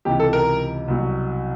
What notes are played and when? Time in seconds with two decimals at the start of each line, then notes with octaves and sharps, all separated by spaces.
0.05 C#2 C3 E3 G4
0.20 A4
0.33 A#4
0.88 C2 B2 F#3